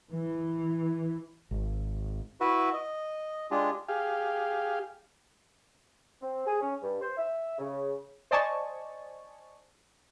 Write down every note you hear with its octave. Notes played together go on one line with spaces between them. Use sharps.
E3
G#1
E4 F#4 B4 E5
D#5
G#3 D4 F4 G4 G#4
G4 G#4 F5
C4
G#4
C#4
G2
C5
E5
C#3
C5 D5 D#5 G#5 A5 C#6